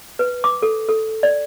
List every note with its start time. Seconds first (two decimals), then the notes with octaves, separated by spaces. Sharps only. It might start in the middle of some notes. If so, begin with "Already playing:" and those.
0.19 B4
0.44 D6
0.62 A4
0.88 A4
1.23 D5